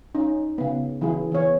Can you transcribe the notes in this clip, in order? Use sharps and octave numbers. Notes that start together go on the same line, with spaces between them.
C#4 D#4
C#3 B3
E3 F#3 E4 G#4
E3 B3 C#5